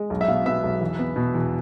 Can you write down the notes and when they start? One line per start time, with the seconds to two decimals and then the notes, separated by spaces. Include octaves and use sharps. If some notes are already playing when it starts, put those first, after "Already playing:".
Already playing: G#3
0.10 B1
0.21 E5
0.28 B2 F5
0.46 B3 E5
0.64 B1
0.81 E2
0.99 B3
1.16 B2
1.34 E2